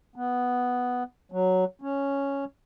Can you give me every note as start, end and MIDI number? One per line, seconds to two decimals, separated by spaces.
0.16 1.03 59
1.32 1.65 54
1.82 2.45 61